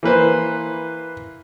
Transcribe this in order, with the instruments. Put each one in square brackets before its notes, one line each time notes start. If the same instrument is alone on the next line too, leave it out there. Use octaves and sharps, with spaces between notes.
[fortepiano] E3 A#3 B4 C5